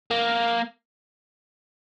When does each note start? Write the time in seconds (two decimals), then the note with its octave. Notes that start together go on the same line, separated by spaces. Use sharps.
0.11 A#3